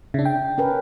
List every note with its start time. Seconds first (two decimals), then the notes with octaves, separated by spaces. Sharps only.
0.14 C#3 D4 E5
0.25 G5
0.58 C#4 A#4 B4